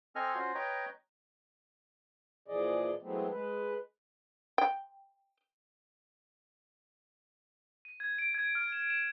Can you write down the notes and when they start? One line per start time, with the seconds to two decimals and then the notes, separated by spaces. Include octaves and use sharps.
0.16 C4 A4 D#5 G#5 F6
0.35 C#4 F4 F#4 C5
0.55 B4 C#5 D#5 G5 A#5
2.48 A#2 E3 F3 G#4 D5 D#5
3.02 E3 F#3 G#3 A3 B3 C4
3.31 G#3 B4
4.58 G5
7.85 D#7
8.00 G#6
8.18 D7
8.35 G#6
8.55 F6
8.72 E7
8.90 E7